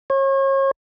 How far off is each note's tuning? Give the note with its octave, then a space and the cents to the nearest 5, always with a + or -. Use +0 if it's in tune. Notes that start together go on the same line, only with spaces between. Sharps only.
C#5 -35